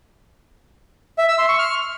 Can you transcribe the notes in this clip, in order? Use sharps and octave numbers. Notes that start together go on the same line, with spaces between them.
E5
E6
C6
C#6
F6